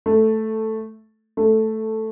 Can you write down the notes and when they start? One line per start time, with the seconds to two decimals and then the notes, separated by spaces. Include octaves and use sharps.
0.06 A3
1.37 A3